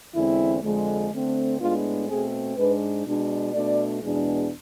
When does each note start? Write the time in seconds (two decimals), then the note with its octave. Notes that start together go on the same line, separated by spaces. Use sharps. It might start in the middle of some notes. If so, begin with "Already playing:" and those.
0.13 E2 D3 G#3 C4 E4
0.62 F2 D3 G#3
1.11 D3 A3 C4
1.59 A2 G#3 B3 D4 F4
2.08 B2 A3 C4 G#4
2.56 G#2 G#3 D4 B4
3.05 B2 G#3 D4
3.53 B2 A3 D4 D5
4.02 E2 B2 G#3 B3 D4